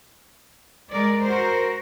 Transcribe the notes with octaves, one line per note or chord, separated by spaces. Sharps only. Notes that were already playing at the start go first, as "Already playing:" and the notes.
G#3 A#4 D5
F#4 A#4 C5